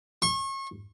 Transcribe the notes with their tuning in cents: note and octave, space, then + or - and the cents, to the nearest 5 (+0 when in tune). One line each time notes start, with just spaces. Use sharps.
C#6 -35